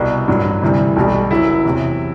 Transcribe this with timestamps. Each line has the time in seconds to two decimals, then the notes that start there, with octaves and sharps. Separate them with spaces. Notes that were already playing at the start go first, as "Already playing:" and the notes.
Already playing: C2 B2 G3
0.28 A1 G2 F#3
0.62 D2 C3 E3 G3
0.96 B1 B2 G3
1.31 F#1 F#2 F#3 E4
1.65 E2 C3 F#3